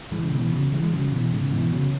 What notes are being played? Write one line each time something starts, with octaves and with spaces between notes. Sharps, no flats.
E3 G#3
C#3
B2 E3
C#3 F#3
E3 G#3
G#3
C#3 F#3
B2 E3
G#2 C#3
B2 E3
C#3 F#3